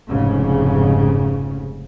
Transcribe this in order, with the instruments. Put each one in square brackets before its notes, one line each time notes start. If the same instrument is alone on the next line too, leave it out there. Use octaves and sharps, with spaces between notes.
[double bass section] F1 G#2 C#3